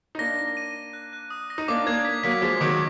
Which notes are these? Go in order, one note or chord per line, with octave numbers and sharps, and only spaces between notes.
D#4
A#3 D4 A#6
A#6
D#7
A#6
F#6
F#6
D#6
A#6
D#4
A#3 D4 D6
A#3 D4 G#6
B6
F#3 A#3 B6
F3 G#3 B6
D#3 F#3 D6